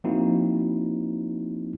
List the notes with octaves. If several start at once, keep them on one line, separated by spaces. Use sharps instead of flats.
F3 A#3 C4 D#4 E4 F#4